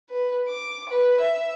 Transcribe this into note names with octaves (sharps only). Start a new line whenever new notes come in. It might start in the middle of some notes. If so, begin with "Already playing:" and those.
B4
D6
B4
E5